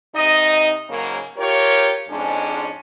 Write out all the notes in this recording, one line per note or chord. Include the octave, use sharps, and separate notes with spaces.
C3 D#4 D#5
G#2 C#3 F#3 A#3
F4 G4 A#4 C#5
F2 G#2 G#3 C#4 D4